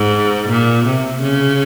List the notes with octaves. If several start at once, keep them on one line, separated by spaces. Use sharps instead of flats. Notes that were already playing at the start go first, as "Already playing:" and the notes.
Already playing: G#2
A#2
C3
C#3